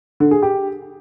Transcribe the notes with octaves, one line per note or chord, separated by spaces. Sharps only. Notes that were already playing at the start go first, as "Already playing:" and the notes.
D3
G#4
G4